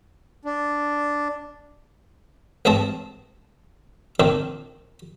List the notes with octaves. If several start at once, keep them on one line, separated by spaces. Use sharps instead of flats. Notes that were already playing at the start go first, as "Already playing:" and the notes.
D4
A1 G2 G#3 C4 D#5 A5
A#2 D#3 C4 D4